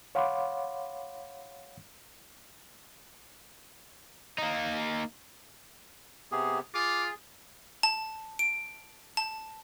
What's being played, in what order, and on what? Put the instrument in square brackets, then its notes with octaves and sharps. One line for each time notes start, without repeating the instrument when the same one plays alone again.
[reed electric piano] C#5 F5 F#5 B5 C6 D6
[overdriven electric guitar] A#3 D#4
[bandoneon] C3 B3 G4 [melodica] G#4
[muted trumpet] F4 [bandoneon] G#4 [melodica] D6
[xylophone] A5
D7
A5